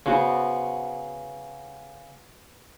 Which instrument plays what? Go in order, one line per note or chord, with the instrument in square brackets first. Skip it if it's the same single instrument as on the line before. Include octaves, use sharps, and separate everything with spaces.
[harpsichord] C#3 [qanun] B3 F#4 C5